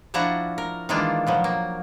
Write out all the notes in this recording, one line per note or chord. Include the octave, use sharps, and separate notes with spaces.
F3 D4 E4 F#4 F#5 A#5
A#4
D#3 E3 G#3 A#3 D4 F4
B2 F3 F#3
A#3